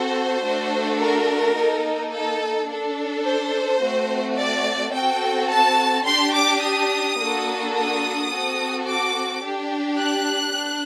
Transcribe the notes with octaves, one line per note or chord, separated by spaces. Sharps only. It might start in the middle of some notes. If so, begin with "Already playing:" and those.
Already playing: C4 F#4 A4 C5
A3 D4 F#4 A4
A#4
A#3 D#4 A4
A4
D4 A4
C5
A3 C4 F#4
D5
C4 F#4 A4 G5
A5
D4 G4 C6
D6
D#6
A#3 D4 F#4 A4
D#6
C4 F#4 A4
D6
D4 G4
F#6
D4